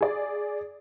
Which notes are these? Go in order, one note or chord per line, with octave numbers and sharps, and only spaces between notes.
G#4 D5